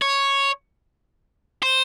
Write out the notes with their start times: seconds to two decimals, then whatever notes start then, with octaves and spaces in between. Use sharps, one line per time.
0.02 C#5
1.63 C5